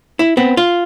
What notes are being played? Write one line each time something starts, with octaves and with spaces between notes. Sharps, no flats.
E4
B3 C4
F4